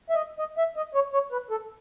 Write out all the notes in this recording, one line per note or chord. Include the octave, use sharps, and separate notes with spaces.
E5
D#5
D#5
E5
D#5
C#5
C#5
B4
A4